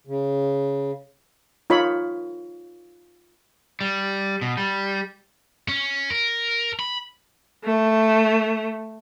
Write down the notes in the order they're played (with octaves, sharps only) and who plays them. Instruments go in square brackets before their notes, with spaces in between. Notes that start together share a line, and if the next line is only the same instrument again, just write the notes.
[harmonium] C#3
[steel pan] D#4 F4 C#5 B5
[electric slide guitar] G3
B2
G3
[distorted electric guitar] C#4
A#4
B5
[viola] A3